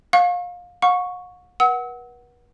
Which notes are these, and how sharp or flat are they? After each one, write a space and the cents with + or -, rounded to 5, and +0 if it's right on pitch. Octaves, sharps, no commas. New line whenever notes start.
F5 +25 C#6 -25
F#5 -45 C#6 +0
B4 -40 F#5 +5 E6 -40